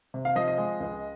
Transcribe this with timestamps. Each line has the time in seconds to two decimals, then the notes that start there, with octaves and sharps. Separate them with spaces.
0.14 C3
0.25 F5
0.35 F3 D#5
0.48 D#5
0.58 G#3
0.80 C#2